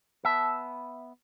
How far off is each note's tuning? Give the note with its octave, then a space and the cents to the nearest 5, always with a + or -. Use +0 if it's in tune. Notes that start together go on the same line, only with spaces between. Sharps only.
B3 +0 E5 +0 A5 -15